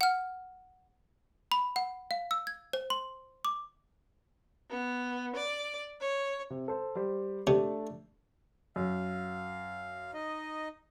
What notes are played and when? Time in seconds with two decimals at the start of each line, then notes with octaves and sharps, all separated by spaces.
0.01 F#5 F6
1.52 B5
1.76 F#5
2.11 F5
2.31 E6
2.47 G#6
2.73 C5
2.90 C6
3.45 D6
4.69 B3
5.35 D5
6.00 C#5
6.50 C3
6.68 A4 C5
6.95 G3 G4 C5
7.47 C3 A3 D4
8.76 F#2 F5
10.14 D#4 D#5